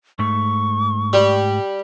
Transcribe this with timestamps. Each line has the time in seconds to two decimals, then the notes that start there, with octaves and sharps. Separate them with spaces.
0.19 G#2 A3 C#6
1.13 G3